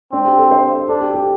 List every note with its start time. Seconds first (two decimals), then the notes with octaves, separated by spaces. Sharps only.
0.12 C4 D4
0.25 G4
0.38 A4
0.51 C5
0.89 D4 A4
1.01 G4
1.14 G4